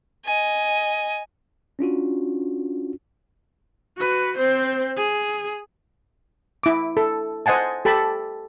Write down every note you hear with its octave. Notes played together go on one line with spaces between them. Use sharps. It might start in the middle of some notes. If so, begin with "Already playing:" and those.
D#5 G#5
C#4 D4 F4 F#4
F#4 B4
C4 C5
G#4
E4 D6
A4
C5 D#5 F#5 G#5 A5
G4 A4 A5 B5